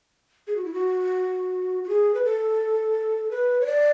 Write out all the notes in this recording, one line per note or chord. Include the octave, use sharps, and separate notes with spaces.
G#4
F#4
E4
F#4
F#4
G#4
B4
A4
B4
C#5
D5